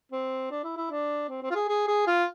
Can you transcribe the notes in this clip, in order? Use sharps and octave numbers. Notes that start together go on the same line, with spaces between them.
C4
D4
E4
E4
D4
C4
C4
F4
G#4
G#4
G#4
F4